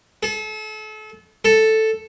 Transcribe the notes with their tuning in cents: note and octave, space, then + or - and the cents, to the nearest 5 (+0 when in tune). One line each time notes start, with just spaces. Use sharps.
A4 -35
A4 +0